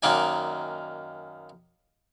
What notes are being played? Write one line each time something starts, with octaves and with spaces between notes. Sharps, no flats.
F#2 D#3 A#3 D#4 D5 G#5